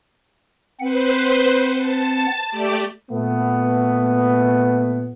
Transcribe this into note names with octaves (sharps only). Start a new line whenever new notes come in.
C4 B4 C5 F#5
A5
A3 G4 D5
A#2 A3 B3